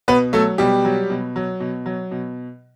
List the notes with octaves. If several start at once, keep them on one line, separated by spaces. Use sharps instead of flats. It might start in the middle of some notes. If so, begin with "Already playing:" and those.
B2 B3 B4
F#3 A3 A4
B2 G3 G4
F#3
B2
F#3
B2
F#3
B2